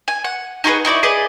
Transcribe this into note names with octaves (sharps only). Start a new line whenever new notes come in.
G#5
F#5
D#4 F#4 G#4 B4
D#4 E4 F#4 D5
G#4 B4 D5 D#5